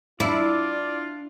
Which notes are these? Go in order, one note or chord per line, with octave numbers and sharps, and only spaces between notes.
D4 E4 F4 D5 F5